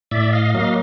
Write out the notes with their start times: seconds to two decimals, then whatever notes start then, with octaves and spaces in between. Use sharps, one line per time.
0.11 A2 D5 E5
0.33 D#5 F5
0.55 F#3 A#3 D#5 F5